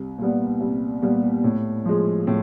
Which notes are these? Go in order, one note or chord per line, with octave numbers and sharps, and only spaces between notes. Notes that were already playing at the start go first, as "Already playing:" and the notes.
Already playing: C2
A#2 G3 B3
C2
A#2 G3 B3
A2
F3 G#3
A2